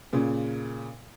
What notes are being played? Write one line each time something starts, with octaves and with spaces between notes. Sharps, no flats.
A#2 C#3